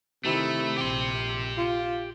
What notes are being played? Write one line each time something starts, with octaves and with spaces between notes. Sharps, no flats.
C3 D#3 A3 E4
A#1 G4 C6
F4